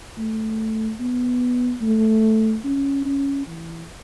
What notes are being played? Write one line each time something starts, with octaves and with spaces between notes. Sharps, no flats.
A3
B3
A3
C#4
C#4
E3